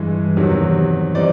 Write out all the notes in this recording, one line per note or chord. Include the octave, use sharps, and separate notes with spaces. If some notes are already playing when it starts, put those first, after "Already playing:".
Already playing: G2 E3 G#3
E2 C3 D#3 F#3
E3 G3 C4 D#4 D5